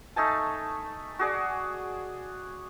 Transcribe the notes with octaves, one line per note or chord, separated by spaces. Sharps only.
A3 D#4 G#5 A5
F#4 G#4 D5